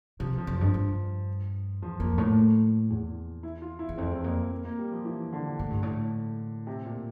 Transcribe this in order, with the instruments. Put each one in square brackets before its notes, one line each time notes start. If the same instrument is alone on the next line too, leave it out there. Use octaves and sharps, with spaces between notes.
[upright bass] C3 [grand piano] F3
[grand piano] F3
[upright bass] F2
[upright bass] G2 [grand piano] F3
[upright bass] G2
[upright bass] E2 [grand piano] F3
[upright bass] F2 [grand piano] A#3
[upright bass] A2
E2
[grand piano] E4
F4
E4
[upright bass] E2
[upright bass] F2 [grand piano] C4
[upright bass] E2
[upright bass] F2 [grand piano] A#3
[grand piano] A#3
A#3
G3
F3
E3
D3
[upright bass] A2
G2
A2
[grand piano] C3
A#2